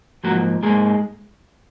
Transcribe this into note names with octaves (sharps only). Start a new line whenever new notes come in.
G#2 F3 F#3 A#3 F#4
G#2 F3 G#3 A#3 G#4